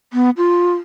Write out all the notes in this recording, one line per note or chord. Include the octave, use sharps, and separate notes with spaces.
B3
F4